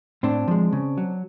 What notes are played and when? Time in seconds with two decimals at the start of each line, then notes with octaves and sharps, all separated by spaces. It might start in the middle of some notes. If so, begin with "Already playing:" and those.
0.23 A2 C4 D4
0.48 F3 G#3
0.73 C#3
0.98 F#3